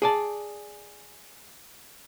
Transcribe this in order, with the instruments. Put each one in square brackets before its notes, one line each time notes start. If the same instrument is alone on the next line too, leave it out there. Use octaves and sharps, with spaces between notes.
[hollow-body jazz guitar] G#4 D5 A5